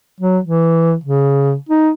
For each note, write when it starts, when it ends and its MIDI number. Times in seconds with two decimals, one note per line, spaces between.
0.20 0.38 54
0.44 0.94 52
1.04 1.54 49
1.69 1.91 63